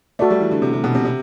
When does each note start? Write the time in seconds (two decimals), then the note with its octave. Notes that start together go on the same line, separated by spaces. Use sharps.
0.19 A3 F#4 A4 D5
0.30 G3
0.41 E3
0.51 D3
0.62 C3
0.73 C3
0.84 B2
0.95 C3
1.05 C3